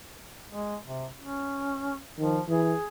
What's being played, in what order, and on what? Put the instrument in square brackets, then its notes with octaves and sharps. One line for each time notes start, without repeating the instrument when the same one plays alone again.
[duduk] G#3
C3
C#4
[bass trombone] D#3 [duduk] F3
[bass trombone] E3 [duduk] G#4